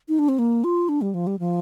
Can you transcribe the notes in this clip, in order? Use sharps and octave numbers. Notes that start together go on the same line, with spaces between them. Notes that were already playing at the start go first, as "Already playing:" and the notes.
D#4
D4
C4
A#3
F4
D4
G3
F3
G3
F3